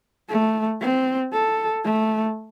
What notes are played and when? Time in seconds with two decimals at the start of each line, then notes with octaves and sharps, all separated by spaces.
0.29 A3
0.81 C4
1.33 A4
1.85 A3